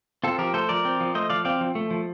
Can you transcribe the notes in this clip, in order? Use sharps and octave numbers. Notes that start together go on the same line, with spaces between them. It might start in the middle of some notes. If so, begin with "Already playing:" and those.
C4 F4 A4
F3 G4 A#4
A3 A4 C5
F3 A#4 D5
C4
F3
A3 C5 D#5
F3 D5 F5
C4 D5 F5
F3
A3
F3